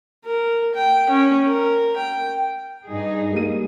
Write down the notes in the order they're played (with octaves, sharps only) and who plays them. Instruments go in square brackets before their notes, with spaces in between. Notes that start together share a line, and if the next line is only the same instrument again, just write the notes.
[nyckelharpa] A#4
G5
C#4
A#4
G5
[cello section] G2 D#4 G#4
[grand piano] G3 A#3 D#7